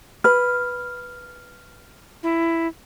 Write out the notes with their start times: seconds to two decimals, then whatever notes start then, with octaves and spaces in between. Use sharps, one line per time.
0.24 B4 F6
2.23 E4